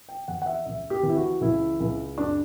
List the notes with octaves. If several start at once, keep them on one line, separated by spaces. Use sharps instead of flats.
G5
E2 F#5
F#5
E5
C#2 E5
G4
E3
E4
F#4
C#2 E4
C#2
F#2 D4